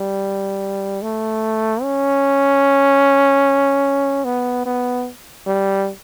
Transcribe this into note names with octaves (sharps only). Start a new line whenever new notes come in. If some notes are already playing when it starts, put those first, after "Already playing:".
Already playing: G3
A3
C#4
B3
B3
G3